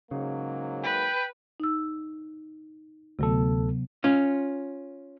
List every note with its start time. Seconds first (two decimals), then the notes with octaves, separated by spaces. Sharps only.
0.11 G#2 C#3 F#3 A#3
0.84 B4 G5
1.60 D#4 E6
3.19 D2 C3 F#3 B3 A4
4.04 C#4 F4